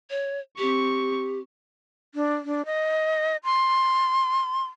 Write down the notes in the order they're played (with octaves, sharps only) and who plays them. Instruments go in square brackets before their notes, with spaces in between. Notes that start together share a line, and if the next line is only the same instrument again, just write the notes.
[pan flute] C#5
[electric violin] C4 C#6 [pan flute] G4
[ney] D4
D4
D#5
C6